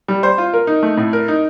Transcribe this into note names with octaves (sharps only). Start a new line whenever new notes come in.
G3
C5
F4
A#4
D#4
A3
A2
A#4
D#4